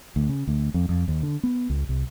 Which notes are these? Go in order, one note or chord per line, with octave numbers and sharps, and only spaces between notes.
D2
C#3
D2
F2
F2
D#2
D3
B3
C#2
C2